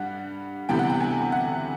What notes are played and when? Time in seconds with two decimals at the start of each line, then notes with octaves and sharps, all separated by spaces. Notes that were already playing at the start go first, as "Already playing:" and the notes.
Already playing: G2 G3 F#5
0.69 D2 C3 E3 G3 B3 G5
0.79 F#5
0.89 G5
1.00 G#5
1.32 F#5